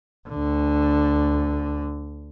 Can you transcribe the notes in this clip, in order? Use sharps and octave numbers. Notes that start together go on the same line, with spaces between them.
D2 D3